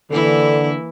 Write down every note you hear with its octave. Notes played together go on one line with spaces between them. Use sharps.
D3 E3 A#3 E4